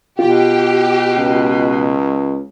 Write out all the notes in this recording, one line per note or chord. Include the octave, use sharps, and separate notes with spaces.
B2 F4 G4
C#2